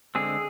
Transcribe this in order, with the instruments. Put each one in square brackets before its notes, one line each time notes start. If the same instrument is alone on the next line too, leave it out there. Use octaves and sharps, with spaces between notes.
[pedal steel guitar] D3 G#3 C4 G#4